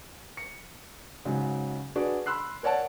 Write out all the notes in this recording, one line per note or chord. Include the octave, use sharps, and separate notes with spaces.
C#7
G#2 C#3 F#3
D4 F#4 G#4 B4 D5
B5 C6 E6 F#6 C7
A#4 C#5 D5 F#5 A5